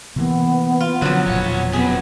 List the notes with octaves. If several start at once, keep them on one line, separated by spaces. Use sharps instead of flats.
C3 E3 A#3 B3
F4
F#2 D3 F3 F#3
E1 A#2 B3 C#5
F#2 C3 B3 G#4